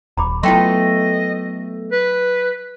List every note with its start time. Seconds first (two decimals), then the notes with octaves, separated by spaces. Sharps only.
0.17 D#1 A#5 B5 D6
0.43 F#3 A3 B3 E4 F4 D#5 G5 C6
1.92 B4